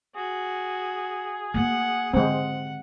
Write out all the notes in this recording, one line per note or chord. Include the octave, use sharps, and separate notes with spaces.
F#4 G#4
A#3 F#5
D3 G#3 C4 F#5